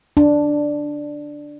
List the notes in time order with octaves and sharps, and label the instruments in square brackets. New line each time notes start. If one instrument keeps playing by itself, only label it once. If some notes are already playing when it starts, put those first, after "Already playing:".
[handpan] D4